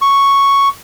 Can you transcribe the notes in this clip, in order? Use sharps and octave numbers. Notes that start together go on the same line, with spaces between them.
C#6